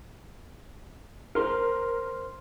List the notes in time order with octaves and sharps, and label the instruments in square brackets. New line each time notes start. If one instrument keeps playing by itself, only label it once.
[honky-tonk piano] A#4 [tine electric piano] C5 C6 F6